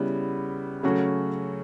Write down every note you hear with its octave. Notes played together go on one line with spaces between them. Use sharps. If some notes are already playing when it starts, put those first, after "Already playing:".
Already playing: C#3 G3 B3 E4
C#3 F#3 A3 C#4 F#4